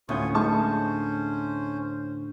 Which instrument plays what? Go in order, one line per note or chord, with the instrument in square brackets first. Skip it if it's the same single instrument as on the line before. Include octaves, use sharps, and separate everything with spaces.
[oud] D2 [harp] A2 C#4 G6 [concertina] F4 C#6 D#6
[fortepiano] G#3 D#4 C#6 [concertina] C#4 C5 [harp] A5